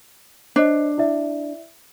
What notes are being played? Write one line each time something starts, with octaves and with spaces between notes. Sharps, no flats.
D4 C5 C#5 D#5
E4 D5 E5